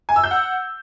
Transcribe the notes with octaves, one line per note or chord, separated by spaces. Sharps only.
G#5
E6
G6
F#5